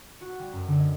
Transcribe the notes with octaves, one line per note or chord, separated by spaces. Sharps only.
F#4
G3
F#2
D3
D#5